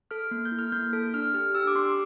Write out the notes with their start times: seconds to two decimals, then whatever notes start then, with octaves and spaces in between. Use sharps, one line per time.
0.11 A4 F6
0.31 A#3
0.45 G6
0.52 E4
0.59 F6
0.72 A#3 G6
0.93 A4
1.14 D4 F6
1.34 G4 F6
1.55 G4 E6
1.67 D6
1.75 D4 C6